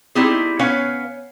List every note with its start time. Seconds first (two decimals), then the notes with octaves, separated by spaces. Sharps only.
0.15 G3 C4 D#4 E4 G4 G#4
0.59 B3 C#4 C#5 F5 G#5